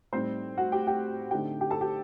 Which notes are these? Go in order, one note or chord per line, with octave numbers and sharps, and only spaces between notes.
A2 G3 C4 D#4 C5
F#4 F#5
G4 G5
G4 G5
D3 A3 C4 D#4 G4 G5
G4 G5
A4 A5
G4 G5